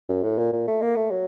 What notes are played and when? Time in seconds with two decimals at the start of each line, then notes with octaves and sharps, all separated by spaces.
0.09 F#2
0.23 A2
0.38 A#2
0.52 A#2
0.68 A3
0.82 A#3
0.96 A3
1.11 F#3